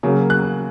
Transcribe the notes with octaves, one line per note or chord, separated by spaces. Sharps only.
C#3 F#3 A#3
F#6